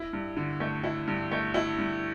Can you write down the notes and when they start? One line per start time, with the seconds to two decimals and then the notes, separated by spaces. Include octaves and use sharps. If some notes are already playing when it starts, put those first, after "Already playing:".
Already playing: E4
0.13 G2
0.37 D3
0.60 A3
0.84 E4
1.07 G2
1.32 A3
1.54 E4
1.79 G2